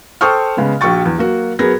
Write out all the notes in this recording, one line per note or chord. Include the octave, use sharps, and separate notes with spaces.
A4 C5 G5 C#6 D#6 F6
C#3 G#3 B3
A#1 F#4 G5 C#6 A6
E2
F#3 A#3 F#4
F#3 B3 G#4 A#4 G#6 A#6